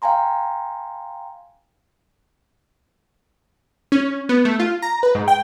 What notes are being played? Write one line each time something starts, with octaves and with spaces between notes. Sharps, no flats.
F5 G5 G#5 A#5 C6
C#4
B3
A3
F4
A#5
B4
G#2
G5